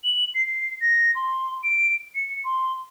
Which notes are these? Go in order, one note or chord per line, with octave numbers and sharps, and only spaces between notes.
F#7
C7
A#6
C6
D7
C#7
C6